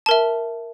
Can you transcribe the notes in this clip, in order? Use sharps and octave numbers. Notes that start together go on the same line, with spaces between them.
A#4 E5 A5